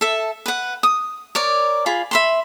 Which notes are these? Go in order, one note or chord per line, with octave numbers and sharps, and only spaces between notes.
A4 E5
B4 F#5
D#6
A#4 C#5 D5
F4 G#4 B5
E5 B5 C6